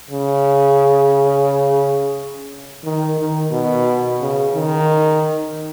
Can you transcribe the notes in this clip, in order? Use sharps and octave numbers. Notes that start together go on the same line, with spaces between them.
C#3
D#3
D#3
B2
C#3
D#3